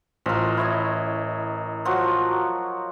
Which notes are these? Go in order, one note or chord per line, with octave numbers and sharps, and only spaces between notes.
A1 F3 A#4
E4 C#5 D#5
F3 F#3 F#4